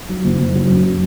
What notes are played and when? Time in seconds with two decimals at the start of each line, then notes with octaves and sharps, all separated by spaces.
0.09 F#3
0.24 F#1
0.39 F#1
0.54 F#3
0.70 F#2